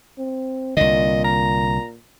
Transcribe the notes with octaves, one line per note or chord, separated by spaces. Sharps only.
C4
C2 A#2 D3 D#5
A#5